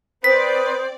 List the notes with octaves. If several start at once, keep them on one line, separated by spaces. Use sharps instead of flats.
C4 B4 C5 D5 D#6 B6